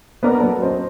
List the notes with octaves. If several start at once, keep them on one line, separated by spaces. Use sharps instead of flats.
B3 D4 A#4 D5
F#3 B3 A4
C#4 C5 D#5